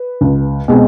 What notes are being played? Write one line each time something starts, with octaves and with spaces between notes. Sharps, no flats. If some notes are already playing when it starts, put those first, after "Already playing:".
Already playing: B4
C#2
B2 G#3 C4